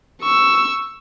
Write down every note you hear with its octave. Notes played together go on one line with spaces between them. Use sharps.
C#6 E6